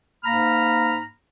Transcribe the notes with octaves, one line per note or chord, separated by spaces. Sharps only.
G#2 A#3 A#5 B5 F6